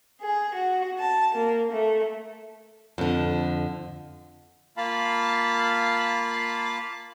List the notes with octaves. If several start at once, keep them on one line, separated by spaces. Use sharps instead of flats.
G#4
F#4
A5
A#3
A3
F2 D3
A#3 F4 F5 A5 B5